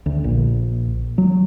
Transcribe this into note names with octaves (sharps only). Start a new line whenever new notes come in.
D2
A#1
F#3